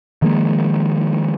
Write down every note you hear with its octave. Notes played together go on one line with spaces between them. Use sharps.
D#3 F3 G#3 A#3